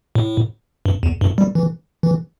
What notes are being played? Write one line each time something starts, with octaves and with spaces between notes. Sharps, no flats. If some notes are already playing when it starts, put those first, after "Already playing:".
A2
G2
E2
G2
G3
E3
E3